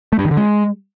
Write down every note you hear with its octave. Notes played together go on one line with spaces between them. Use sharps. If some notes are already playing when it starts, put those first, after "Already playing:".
A3
G2
D#3
D3
G#3